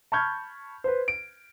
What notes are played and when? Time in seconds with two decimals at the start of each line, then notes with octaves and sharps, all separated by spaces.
0.12 A5 B5 C#6 F6 G6 G#6
0.84 B4 C5
1.08 D7